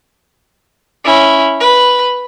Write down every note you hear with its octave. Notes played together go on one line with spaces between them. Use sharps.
C#4 E4
B4